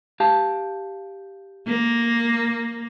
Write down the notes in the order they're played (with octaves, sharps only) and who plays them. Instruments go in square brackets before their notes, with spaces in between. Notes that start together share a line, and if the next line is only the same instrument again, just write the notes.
[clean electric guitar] G4 F5 A5
[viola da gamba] A#3